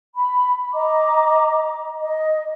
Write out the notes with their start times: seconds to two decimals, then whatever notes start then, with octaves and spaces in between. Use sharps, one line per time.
0.15 B5
0.73 D#5 A#5 D6
2.01 D#5